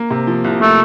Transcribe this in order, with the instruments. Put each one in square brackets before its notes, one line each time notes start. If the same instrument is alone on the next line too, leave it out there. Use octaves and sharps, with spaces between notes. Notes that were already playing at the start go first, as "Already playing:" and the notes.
Already playing: [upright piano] A#3
C3
F3
C2
[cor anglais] A3 [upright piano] A#3